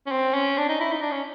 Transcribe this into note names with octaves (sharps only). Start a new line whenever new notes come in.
C#4
C4
C#4
D4
D#4
E4
D#4
D4
C#4